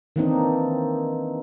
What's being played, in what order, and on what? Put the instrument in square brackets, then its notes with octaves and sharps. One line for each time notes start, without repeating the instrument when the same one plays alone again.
[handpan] D#3 E3 A#3 C4 D4 D#4